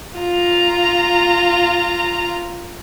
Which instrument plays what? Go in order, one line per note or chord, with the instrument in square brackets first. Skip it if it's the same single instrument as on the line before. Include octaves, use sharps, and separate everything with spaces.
[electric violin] F4 A#5